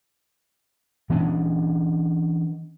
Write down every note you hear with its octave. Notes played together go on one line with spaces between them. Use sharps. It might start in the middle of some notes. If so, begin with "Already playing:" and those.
E3 B3 C#4 D4